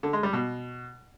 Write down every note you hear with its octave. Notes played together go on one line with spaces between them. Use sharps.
D3
G#3
G3
B2